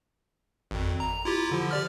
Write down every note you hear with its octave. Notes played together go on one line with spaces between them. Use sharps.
G#1 F2
A#5
E4 F4 G4
D3 F3
G4 D5 F6